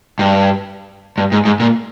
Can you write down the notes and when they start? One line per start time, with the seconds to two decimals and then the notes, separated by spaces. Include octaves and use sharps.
0.19 G2
1.18 G2
1.32 G#2
1.45 G#2
1.60 A#2